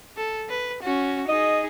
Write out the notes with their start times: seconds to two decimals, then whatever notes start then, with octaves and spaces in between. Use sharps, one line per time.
0.17 A4
0.50 B4
0.83 C#4 F#4
1.29 D#4 G#4 D#5